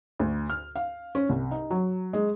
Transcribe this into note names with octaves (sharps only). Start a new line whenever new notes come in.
D2
F6
F5
C#4
C2
D#4
F#3
G#3